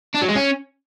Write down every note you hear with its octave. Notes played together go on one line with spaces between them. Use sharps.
D4
F#3
G#3
C#4